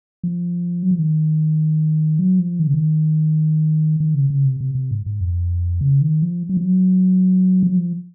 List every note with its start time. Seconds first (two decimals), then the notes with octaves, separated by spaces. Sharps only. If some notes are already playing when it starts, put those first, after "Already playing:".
0.24 F3
0.83 F#3
0.91 F3
0.99 D#3
2.19 F#3
2.39 F3
2.59 D#3
2.67 C#3
2.74 D#3
4.00 D#3
4.15 C#3
4.30 C#3
4.45 C3
4.61 C3
4.75 C3
4.91 G#2
5.06 G#2
5.21 F2
5.81 C#3
6.01 D#3
6.22 F3
6.49 F#3
6.57 F3
6.65 F#3
7.63 F3
7.69 F#3
7.77 F3